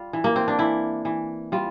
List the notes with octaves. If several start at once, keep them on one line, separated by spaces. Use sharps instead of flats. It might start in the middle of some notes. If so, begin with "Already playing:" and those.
Already playing: G3 F4
E3
A#3
C4
D4
E3 E4
E3
G3 F4